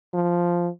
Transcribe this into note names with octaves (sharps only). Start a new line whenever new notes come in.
F3